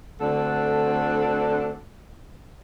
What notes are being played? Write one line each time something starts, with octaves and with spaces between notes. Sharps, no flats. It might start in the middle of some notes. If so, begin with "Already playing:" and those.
D2 D3 C4 D4 A4 F#5